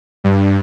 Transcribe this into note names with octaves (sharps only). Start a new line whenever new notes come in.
G2